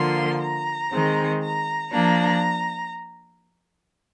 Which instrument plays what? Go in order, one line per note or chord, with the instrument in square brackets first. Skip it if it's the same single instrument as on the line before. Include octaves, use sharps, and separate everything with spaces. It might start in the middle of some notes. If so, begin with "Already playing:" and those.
Already playing: [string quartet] D3 F3 A#3 C6
A#5
D#3 G#3 C4
A#5
F3 A#3 D4 A#5